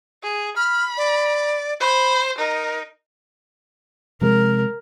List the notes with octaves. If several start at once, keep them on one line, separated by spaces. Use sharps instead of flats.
G#4
B5 F6
D5
C5 B5
D#4 A#4
C3 F3 G#3 A#4